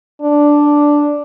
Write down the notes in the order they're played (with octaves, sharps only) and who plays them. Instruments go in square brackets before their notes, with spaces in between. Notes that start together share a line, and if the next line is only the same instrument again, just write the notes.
[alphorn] D4